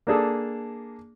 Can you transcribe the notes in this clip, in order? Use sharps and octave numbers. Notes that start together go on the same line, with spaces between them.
A#3 D4 G#4 A4